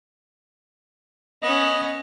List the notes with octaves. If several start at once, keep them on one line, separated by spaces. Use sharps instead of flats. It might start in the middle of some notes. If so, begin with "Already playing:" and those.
B3 C#4 D#5